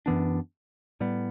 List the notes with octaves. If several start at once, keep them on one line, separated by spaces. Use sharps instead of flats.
F#2 E3 B3 D4
A2 G3 B3